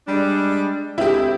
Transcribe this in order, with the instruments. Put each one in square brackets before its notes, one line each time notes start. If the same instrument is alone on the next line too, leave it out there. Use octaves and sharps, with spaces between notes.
[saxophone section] G3 G#3 D4
[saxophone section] D2 G#3 C4 [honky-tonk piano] E4 G4